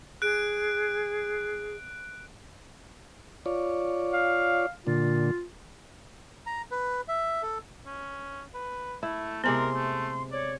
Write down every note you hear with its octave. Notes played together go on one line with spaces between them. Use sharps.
G#4 F#6 D7
F4 C#5 D5
F5
A#2 D3 F4
A#5
B4
E5
A4
C#4
B4
A3 E4
C3 G#3 B3 A#4 C5 G#5 C6
A3
C#5 D5